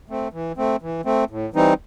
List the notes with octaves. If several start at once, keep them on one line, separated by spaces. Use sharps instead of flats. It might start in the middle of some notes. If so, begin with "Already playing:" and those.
A3 C4
E3
A3 C4
E3
A3 C4
A2
E3 G3 C4 D#4